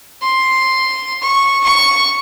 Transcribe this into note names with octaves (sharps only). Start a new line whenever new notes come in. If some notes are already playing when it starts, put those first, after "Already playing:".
C6
C#6
C#6